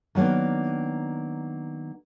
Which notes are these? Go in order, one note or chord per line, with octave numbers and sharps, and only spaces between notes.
D#3 F#3 A#3 B3 D4